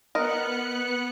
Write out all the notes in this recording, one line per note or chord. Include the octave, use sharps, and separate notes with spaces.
B3 A#4 D#5 F#6 C#7